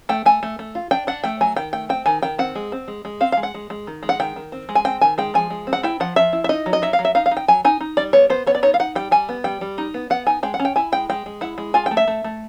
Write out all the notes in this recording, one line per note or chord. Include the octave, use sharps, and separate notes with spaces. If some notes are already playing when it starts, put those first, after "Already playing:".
A3 G5
A3 G#5
A3
A3
F4
D4 G5
D4 F#5
A3 G5
F#3 G#5
D#3 G5
A3 G5
C4 G5
D#3 G#5
D#3 G5
C4 F#5
G#3
C4
G#3
G#3
C4 F5
F5
G#3
F#5
G#3
G#3
D#3
G#3
F#5
D#3 G5
D#3
C4
G#3
G#5
C4 G5
D#3 G#5
G#3 G5
F3 G#5
G#3
C4
F#5
E4 G5
F3 F#5
F3 E5
E4
E5
D#4 D#5
F#3
D#5
F#3 E5
F5
F#3
E5
D#4 F5
F5
D#4
G5
F#3 G#5
D#4 G#5
D#4
G3 D5
B3 C#5
B3 C5
B3 C#5
D5
D#4 C#5
F5
D#4 F#5
G3 G5
G3 G#5
B3
G3 G5
G3
D#4
B3
B3 F#5
D#4 G#5
G#3 G5
F#5
C#4
G5
E4 G#5
G#3 G5
G#3 G5
G#3
E4 F#5
G#3
F4 G#5
G5
A3
E5
A3
A3